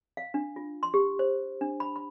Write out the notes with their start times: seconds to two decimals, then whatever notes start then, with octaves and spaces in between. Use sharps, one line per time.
0.17 F5
0.34 D4
0.56 F4
0.83 C6
0.94 G4
1.19 C5
1.61 D4
1.80 B5
1.96 B5